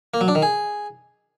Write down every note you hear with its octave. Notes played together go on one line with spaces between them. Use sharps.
A#3
F#3
D4
D#3
G#4